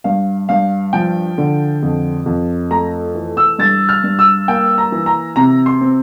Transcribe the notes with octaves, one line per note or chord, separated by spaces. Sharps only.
G2 F5
G2 F5
F3 G5
D3
F2
F2
A3 A#5
E3
E6
G2 A6
F6
G2
E6
A#3 G5
A#5
E3
A#5
C3 A#5
C6
C4